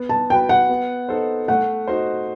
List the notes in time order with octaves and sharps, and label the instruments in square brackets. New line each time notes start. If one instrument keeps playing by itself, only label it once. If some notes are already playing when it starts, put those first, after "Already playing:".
Already playing: [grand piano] B3
[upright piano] A5
[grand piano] F#4 B4 [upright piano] G5
[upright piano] F#5
[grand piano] B3
D#4 A4 C5
[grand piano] A3 [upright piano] F#5
[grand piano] D#4 F#4 C5